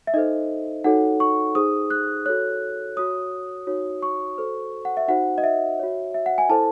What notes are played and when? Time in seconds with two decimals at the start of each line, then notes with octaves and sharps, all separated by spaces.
0.07 E5
0.14 D#4 A4 C5 D#5
0.84 D#4 F#4 A4 C#5 F#5
1.20 C#6
1.55 D#4 G#4 C5 D#6
1.90 F#6
2.26 F#4 A4 C#5 F#6
2.96 F#4 C#5 D#6
3.67 D#4 F#4 C#5
4.02 C#6
4.38 F#4 A4 C5
4.85 F#5
4.97 E5
5.08 D#4 F#4 C5 F#5
5.38 D#5
5.44 E5
5.79 F#4 C#5
6.14 E5
6.26 F#5
6.38 G#5
6.49 E4 A4 C5 A5